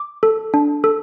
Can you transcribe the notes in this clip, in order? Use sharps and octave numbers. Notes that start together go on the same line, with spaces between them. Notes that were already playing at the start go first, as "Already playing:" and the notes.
Already playing: D6
A4
D4
A4